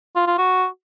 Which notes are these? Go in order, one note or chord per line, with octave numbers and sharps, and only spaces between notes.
F4
F4
F#4